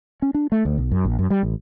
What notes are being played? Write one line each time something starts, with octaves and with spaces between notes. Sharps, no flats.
C#4
D4
A3
D2
B1
F#2
A#1
F#2
G3
A1